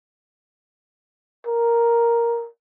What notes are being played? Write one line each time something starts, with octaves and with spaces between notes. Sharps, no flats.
A#4